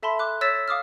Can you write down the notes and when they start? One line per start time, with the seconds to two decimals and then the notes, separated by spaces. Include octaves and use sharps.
0.03 A4 E5 A5 B5 C6
0.19 D6 F#6
0.41 C#5 E6 A6 B6 E7
0.68 F5 D6 D#6 F6